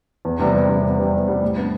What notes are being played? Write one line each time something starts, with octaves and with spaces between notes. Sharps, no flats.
E2
C3 G3 B3
E2
C3 G3 B3
E2
C3 G3 B3
E2
C3 G3 B3
A2
G3 B3 D4